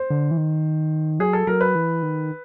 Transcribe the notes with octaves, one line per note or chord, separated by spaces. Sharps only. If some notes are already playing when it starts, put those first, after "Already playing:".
Already playing: C5
D3
E3
D#3
F#3 G#4
A4
F#3 A#4
B4
E3
D#3